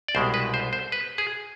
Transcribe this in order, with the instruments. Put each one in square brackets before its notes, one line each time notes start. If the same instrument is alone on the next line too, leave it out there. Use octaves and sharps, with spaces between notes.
[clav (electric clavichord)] D5
C2 B2 G#3 C5
B4
C5
C5
B4
G#4